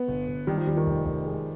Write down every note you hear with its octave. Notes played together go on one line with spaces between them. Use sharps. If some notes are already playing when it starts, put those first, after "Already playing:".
Already playing: B3
G1
G1
D#3 G3
F3
D#2 G3
D#3
F1
F1
G#3